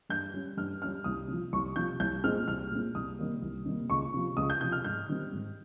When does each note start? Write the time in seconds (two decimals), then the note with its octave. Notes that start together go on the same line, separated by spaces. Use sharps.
0.10 G2 G6
0.34 G3 C#4
0.57 G2 F6
0.81 G3 C#4 F6
1.04 C2 D#6
1.28 C3 F3
1.53 C2 C#6
1.76 C3 F3 G6
2.00 C2 G6
2.24 A#2 G#3 C4 F6
2.48 C2 F6
2.71 A#2 G#3 C4
2.95 C2 D#6
3.19 C3 D#3 G3 A#3
3.42 C2
3.65 C3 D#3 G3 A#3
3.90 C#2 C#6
4.14 C3 F3
4.37 C#2 D#6
4.50 G6
4.61 C3 F3 G6
4.72 F6
4.84 G#2 G6
5.09 D#3 G3 C4
5.32 G#2